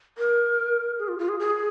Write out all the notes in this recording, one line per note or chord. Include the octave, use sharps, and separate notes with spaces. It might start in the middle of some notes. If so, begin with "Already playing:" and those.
A#4
G#4
F4
F4
G#4
G#4